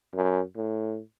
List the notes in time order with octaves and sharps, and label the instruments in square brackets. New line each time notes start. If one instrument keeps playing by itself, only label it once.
[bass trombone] F#2
A2